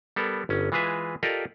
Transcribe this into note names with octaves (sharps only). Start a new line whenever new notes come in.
G3 B3 A4 A#4
G1 C#4
E3 G#3 F4 G#4 B4 E5
F4 G4 A4 A#4 D5 D#5